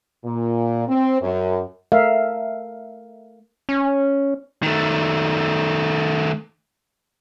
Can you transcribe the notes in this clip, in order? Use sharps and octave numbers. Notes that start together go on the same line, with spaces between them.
A#2
C4
F#2
A3 A#4 E5 F5
C#4
D#3 A3